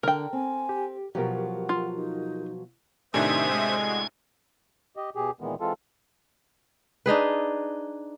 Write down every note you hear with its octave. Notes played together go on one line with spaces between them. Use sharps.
D3 A#4 G5
C4 G#5
G4
B2 F3 F#3 G4 A#4 F#5
F4
D#4
A2 C3 D#3 D4 C5 E5 G#5 D#6
G#3
F#4
G4 D#5
B2 G4 G#4
A#2 D#3 E3 G#3 B3
E3 G#3 C4 F4 A4
D4 D#4 G#4 B4